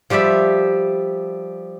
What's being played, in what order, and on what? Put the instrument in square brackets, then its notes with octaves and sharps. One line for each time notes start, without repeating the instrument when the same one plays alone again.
[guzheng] F3 G3 G4 E5 B5